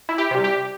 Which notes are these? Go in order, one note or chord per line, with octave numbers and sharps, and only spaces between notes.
E4
G4
C3 G3
G4